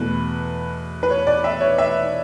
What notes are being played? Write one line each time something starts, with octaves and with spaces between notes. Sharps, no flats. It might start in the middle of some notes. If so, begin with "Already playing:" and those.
Already playing: E2 B2 A3 B4
B4
C#5
D5
E5
C#5
E5